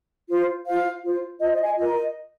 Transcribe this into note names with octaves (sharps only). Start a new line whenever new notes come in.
F4 C5
F4 C5 F5
F4 C5
F4 C5 D#5
D#5
D#5 G#5
F4 A#4 D#5